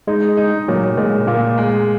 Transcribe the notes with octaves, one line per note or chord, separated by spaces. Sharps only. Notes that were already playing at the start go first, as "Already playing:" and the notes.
G#3 D#4
D#4
A#2 F#3
A#2 G#3
A#2 A#3
G#3